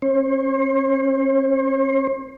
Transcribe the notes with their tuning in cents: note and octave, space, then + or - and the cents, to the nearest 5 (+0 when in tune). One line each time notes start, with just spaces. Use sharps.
C#4 -40 C5 +45